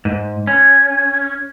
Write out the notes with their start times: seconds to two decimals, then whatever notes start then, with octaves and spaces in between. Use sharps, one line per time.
0.05 G#2
0.47 C#4